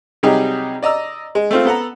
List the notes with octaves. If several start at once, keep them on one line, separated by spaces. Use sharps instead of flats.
C3 F#3 G3 D#4 G4 G#4
D5 D#5 A#5 E6
G#3
A3 C4 F4
B3 A4 F#5 A#5